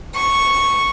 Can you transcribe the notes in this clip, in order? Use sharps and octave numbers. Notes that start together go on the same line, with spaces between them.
C#6